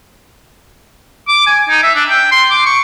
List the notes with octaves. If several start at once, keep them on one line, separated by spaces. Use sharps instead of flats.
D6
G#5
D#4
E5
D4
G5
C6
D6
C#6